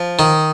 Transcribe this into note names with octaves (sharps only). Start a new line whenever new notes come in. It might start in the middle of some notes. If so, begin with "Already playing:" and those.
Already playing: F3
D#3